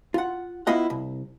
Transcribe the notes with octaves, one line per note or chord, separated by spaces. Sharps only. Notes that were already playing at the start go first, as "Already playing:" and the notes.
F4 F#5
B3 E4 F4 D#5 F#5
C2